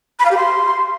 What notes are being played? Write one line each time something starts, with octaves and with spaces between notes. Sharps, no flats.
B5
F5
G4
C6